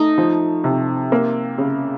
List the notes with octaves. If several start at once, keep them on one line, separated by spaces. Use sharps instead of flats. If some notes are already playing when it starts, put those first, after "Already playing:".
Already playing: A3 D#4
F3
C3
A#3
C#3